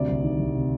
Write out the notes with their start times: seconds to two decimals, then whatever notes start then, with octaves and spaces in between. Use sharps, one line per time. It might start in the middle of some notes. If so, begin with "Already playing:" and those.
Already playing: D2 C3 D5
0.09 C2
0.24 D#3
0.40 C2
0.55 C3